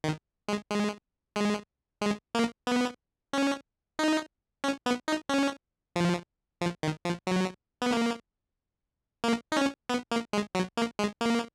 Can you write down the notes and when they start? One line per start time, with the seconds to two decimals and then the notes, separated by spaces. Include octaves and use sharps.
0.04 D#3
0.48 G#3
0.70 G#3
1.36 G#3
2.02 G#3
2.35 A#3
2.67 B3
3.33 C#4
3.99 D#4
4.64 C#4
4.86 B3
5.08 D#4
5.29 C#4
5.96 F3
6.61 F3
6.83 D#3
7.05 F3
7.27 F#3
7.82 B3
7.92 A#3
9.24 A#3
9.52 D#4
9.57 C#4
9.89 B3
10.11 A#3
10.33 G#3
10.55 F#3
10.77 A#3
10.99 G#3
11.21 A#3